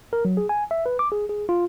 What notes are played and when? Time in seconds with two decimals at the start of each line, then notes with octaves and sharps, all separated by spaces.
0.13 A#4
0.25 F#3
0.37 G#4
0.49 G#5
0.71 E5
0.86 B4
0.99 D6
1.12 G#4
1.29 G#4
1.49 F4